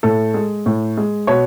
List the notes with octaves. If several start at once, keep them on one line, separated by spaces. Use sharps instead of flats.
A2 A4
G#3
A2
G#3
B2 C#5